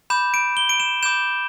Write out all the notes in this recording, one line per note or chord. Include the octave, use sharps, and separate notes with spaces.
B5 D6 G6 E7
D7
G7
D7
E7
B5 D6 G6 E7